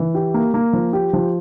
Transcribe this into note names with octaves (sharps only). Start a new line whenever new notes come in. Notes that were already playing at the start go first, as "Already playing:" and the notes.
Already playing: E3
G4
A#3
A#3
F3
G4
F3